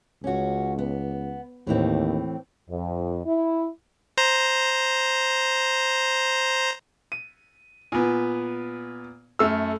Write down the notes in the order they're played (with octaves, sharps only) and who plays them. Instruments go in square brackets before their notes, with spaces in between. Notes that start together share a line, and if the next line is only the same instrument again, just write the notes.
[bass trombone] C#2 [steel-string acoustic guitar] C#4 F#4
[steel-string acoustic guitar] B3
[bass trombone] D#2 [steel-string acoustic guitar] A2 E3 C4
[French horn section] F2
E4
[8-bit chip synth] C5 A#5
[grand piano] D#7
[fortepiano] A#2 B3 [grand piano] G#5
[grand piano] F#2 A3 F6 [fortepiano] E6